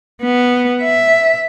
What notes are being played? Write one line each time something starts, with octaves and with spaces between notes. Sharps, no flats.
B3
E5